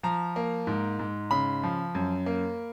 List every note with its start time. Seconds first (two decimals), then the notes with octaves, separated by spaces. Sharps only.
0.03 F3 A#5
0.36 A#3
0.67 G#2
0.99 G#2
1.31 C#3 B5
1.63 F3
1.95 F#2
2.26 A#3